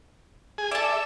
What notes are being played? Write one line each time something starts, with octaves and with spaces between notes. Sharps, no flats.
G#4 G#5
A4 D5 E5